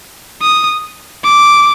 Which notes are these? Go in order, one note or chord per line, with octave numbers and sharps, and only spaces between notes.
D#6
D6